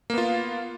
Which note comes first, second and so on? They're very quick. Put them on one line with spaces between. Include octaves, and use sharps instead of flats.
A#3 B3 F4